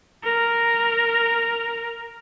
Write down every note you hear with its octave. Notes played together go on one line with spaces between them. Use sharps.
A#4